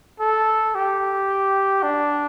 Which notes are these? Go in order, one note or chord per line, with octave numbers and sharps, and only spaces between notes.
A4
G4
D4